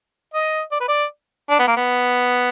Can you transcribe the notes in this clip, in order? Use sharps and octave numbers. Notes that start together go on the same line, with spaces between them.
D#5
D5
B4
D5
D4
B3
A#3
B3